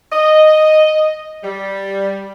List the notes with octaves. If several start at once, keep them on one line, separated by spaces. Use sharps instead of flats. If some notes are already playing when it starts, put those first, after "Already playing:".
D#5
G3